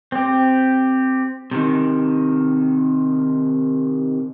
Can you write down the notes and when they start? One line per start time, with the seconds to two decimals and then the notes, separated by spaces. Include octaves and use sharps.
0.12 C4 G4
1.51 C3 D#3